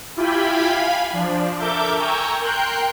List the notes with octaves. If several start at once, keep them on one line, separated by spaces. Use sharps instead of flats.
E4 F4 G4 G5 G#5 B5
F5 G#5 B5
F3 D4
A4 A#4 E5 D6 G6
G5 G#5 A#5 C#6 E6 G6
A#4 G5 C6 F#6 G6